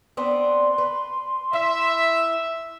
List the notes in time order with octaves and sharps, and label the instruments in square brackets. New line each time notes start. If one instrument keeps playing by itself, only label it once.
[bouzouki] B3 C4 D4 [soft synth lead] C6
[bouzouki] B4
[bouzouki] E4 [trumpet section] E5